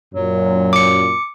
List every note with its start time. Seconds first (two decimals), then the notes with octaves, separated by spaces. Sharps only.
0.14 F#2 A#2 F#3
0.73 D6 C#7